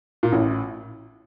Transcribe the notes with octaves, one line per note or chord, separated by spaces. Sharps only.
A#2
A1 A2